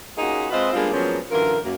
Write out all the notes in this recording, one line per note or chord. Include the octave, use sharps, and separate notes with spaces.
A#3 C#4 D#4 F4 F#4 G#4
G#3 C4 F4 B4 C5 D#5
G3 G#3 A#3 B3 D4 F4
F3 F#3 G#3 A#3 B3 C#4
F#2 D3 E3 F4 A#4
F#2 A#3